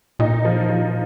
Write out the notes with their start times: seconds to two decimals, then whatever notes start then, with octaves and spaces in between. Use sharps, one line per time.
0.19 A#2 D#4
0.45 F3
0.69 F3